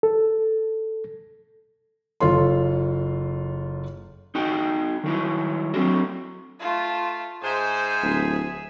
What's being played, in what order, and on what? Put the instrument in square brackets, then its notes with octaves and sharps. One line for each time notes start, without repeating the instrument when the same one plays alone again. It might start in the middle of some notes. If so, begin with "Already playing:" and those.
[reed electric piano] A4
[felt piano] F#1 F4 A4 C#5 C6
[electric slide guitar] D#4 F#4 G5
D#3 F#3 E4
F#3 C4 D4 F#4
[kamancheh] A3 F4
[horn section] G#2 C5 [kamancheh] G#4 E5
[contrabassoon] D1